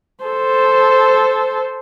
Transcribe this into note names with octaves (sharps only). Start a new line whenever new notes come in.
A4 C5